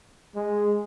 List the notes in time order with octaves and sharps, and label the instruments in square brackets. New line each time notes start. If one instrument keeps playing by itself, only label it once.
[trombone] G#3